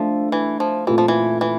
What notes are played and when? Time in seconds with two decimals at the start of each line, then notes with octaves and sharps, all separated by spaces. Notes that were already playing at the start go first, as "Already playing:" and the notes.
Already playing: F3 A3 D4 A4 E5
0.32 E3
0.60 F3
0.87 A#2 E3 A3 C4 F4 A4
0.98 F3
1.08 E3
1.41 E3